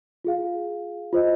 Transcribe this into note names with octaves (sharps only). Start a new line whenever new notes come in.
F4 G#4 F5
F4 G#4 C5 D#5